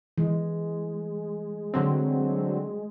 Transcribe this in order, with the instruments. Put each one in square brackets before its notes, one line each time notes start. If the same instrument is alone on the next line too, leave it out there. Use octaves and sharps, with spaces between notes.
[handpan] E3 [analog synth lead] G#3
[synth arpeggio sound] D3 F#3 C4